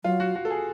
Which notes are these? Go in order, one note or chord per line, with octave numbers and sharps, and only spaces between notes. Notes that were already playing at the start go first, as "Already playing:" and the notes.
F#3 F4
F#4
F#4
A4
G#4